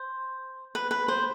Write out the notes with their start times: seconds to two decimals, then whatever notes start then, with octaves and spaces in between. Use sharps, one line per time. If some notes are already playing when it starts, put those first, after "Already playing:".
Already playing: C5
0.75 B4
0.91 B4
1.08 C5